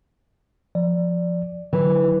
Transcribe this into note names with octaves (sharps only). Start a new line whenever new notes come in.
F3 D5
D3 E3 F#3